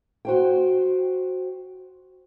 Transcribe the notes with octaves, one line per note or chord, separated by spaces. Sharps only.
F#4 C5 G5